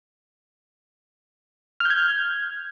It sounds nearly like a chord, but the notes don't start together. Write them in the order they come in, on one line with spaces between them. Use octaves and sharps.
F6 G6 G#6